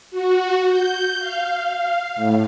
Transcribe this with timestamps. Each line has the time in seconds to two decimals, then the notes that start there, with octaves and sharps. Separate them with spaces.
0.11 F#4
0.69 G6
1.20 F5
2.16 A2